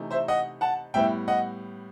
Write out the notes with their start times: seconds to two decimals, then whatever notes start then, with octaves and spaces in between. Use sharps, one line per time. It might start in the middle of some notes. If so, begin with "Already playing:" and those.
Already playing: C3 E3 A3 D#4
0.11 C5 E5
0.28 D#5 F#5
0.61 F#5 A5
0.94 A2 G3 B3 E5 G5
1.28 D#5 F#5